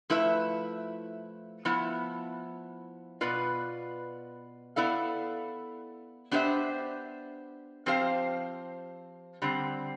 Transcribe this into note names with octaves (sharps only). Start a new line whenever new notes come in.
F3 A3 E4 B4 E5
F3 B3 E4
B2 B3 F4 B4 D5
B3 E4 A4 D5 F5
B3 D4 G4 C5 E5
F3 C4 G4 C5 F5
D3 G3 C4